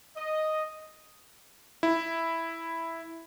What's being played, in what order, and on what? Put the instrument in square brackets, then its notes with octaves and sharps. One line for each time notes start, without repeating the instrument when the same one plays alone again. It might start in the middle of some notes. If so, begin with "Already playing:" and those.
[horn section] D#5
[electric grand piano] E4